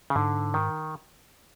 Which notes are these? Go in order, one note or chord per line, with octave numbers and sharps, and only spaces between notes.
C#3
G#2 D3
D#3